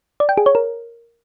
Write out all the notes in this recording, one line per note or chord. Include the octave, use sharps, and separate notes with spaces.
D5
G5
G#4
C#5
A#4